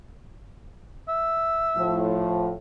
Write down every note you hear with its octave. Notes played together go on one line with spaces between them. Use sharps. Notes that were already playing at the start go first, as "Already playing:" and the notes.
E5
A2 F3